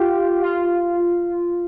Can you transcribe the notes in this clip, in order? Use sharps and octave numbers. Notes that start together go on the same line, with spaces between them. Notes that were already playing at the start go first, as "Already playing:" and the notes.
Already playing: F4 G4
F4